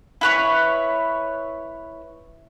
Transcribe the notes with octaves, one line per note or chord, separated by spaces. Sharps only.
E4 B4 C#5